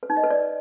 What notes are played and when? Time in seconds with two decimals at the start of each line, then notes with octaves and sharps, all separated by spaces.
0.03 B4
0.10 D#4
0.17 D#5
0.24 B4
0.30 D5